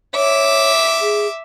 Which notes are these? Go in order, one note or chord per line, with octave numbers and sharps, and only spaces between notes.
C#5 E5 D6
G#4